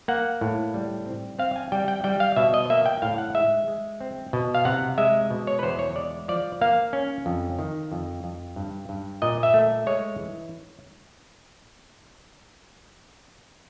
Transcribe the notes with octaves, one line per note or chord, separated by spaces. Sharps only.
A#3 F#5
A2
G3
C4
C4 F5
G#5
G3 G5
G5
G3 G5
F5
B2 E5
D#5
A#3 E5
G5
A2 F5
F#5
G#3 E5
G#3
C4
B2
F5
C3 F#5
G#3 E5
B2
C#5
B4
E2 C5
C#5
G#3 D5
F3 D5
A#3 F5
C#4
F2
D#3
F2
F2
G2
G2
A#2 D#5
E5
A3
G#3 C#5
E3